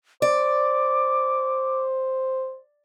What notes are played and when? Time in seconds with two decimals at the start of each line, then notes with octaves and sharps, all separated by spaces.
0.22 C5 D5 D6